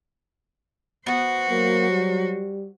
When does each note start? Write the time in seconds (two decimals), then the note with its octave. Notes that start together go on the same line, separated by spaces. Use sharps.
1.06 B3 F#4 C5 F#5
1.50 F#3 A#3
1.91 G3